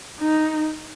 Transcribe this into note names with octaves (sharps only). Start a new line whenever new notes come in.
D#4